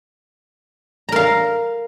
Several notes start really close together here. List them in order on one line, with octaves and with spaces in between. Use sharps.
A#5 A#4 F5